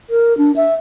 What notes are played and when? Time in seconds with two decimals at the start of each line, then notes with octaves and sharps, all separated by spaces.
0.10 A#4
0.38 D4
0.56 E5